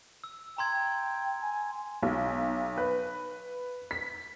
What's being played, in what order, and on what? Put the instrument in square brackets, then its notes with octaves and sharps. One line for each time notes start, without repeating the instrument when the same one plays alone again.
[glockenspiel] E6
[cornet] G5 [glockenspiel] A#5 C6 G#6
[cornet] G#5
[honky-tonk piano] B1
B4
B6